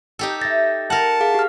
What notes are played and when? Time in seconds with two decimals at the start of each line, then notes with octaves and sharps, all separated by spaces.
0.19 D#4 G4 A4
0.41 D#5 E5 A6 A#6
0.90 A#4 F#5 A5
1.20 G#4 F5
1.35 G4 F6